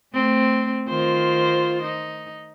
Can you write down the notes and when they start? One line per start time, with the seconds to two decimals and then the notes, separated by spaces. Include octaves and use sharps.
0.14 A3 C4
0.88 D#3 F4 C5
1.82 D#4